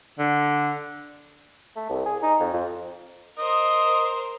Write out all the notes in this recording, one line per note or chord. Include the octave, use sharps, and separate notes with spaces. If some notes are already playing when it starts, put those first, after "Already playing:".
D3
A3
C2
G#4
D#4
F2
F2
A#4 C5 D#5